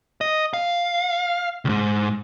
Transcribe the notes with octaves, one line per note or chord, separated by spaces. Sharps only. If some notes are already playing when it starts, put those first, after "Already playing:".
D#5
F5
C#2 G#2